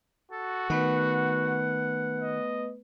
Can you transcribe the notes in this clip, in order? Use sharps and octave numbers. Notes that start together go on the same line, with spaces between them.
F#4 A4
D#3 A3 B3 B4 F#5
D#5